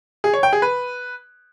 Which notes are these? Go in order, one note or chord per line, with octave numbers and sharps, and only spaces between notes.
G#4
C#5
G5
G#4
B4